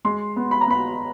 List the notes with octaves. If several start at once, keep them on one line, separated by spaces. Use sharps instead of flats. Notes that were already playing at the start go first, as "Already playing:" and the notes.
G#3 C6
B3
B5
A#5
B3 B5